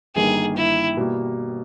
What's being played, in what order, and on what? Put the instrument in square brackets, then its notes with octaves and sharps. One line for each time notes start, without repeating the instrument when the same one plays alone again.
[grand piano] G1 G2 D#3 A#3 D#4 [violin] G#4
[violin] E4
[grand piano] B2 G3 A#3